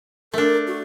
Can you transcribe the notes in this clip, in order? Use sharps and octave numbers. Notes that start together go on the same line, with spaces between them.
A3 D4 A#4
F#4